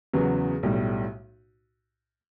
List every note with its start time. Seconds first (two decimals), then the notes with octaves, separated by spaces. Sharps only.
0.13 E2 C#3 F#3 B3
0.63 B1 A2 G3